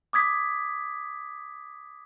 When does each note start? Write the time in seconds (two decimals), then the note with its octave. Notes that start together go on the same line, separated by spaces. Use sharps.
0.13 D6 D#6 G#6 B6